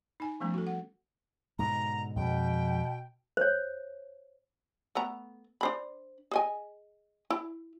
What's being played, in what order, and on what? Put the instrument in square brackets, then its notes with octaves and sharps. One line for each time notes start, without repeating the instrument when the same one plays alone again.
[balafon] D#4 G#5
F3 G3 A3 B3 C#4
F#4 A4
F#5
[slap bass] G#2 B2 D3 [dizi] A#5
[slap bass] F2 G#3 [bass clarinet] B2 [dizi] G5
[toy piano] C5 C#5
[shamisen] A3 B3 A#5
D4 C5 B5
G#4 D#5 G#5
E4